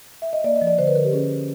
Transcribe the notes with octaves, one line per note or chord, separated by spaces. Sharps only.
E5
D#5
A#3 D5
D#5
F3
D5
D3 C5
B4
D3 A#4
G4
C#4 G#4